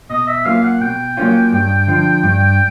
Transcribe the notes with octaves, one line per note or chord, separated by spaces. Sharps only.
B2 D#5
E5
F#3 A#3 C#4 F4 F5
F#5
B2 G5
F#3 A#3 C#4 F4
G2
D3 F3
G2